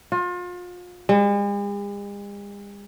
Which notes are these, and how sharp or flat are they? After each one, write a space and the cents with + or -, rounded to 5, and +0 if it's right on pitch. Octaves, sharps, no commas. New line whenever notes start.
F4 +35
G#3 -45